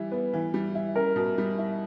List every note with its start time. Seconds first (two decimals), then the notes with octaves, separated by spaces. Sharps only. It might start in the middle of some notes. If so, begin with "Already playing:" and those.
Already playing: E3 G3 E4
0.12 B3 B4
0.33 E3
0.54 G3
0.75 E4
0.96 C#4 A#4
1.16 B2
1.38 G3
1.58 E4